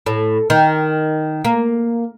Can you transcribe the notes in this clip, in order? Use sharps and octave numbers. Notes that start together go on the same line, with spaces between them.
A2
D#3
A#3